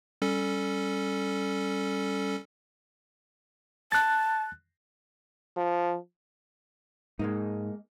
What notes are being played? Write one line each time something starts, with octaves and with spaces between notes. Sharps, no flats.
G3 C#4 A4
A5 F#6 A6
F3
G#2 G#3 A#3 D#4